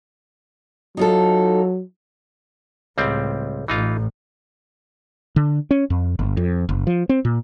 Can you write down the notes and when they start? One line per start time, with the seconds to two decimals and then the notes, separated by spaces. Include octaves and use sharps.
0.97 F#3 D#4 F4 A4
2.98 C#2 A2 G3 C4
3.68 A1 A2 E3 D#4 F4
5.36 D3
5.71 C#4
5.90 F2
6.19 G1
6.37 F2
6.69 F#1
6.87 F3
7.09 C4
7.25 A#2